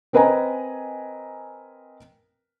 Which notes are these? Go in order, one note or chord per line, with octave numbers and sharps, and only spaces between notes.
C4 A#4 B4 D#5 G#5 A#5